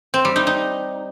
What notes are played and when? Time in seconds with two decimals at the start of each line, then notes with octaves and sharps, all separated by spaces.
0.14 C4
0.25 G3
0.36 D#4
0.47 D#4